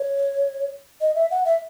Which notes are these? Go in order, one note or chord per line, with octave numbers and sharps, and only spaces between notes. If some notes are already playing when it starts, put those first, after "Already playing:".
Already playing: C#5
D#5
E5
F#5
E5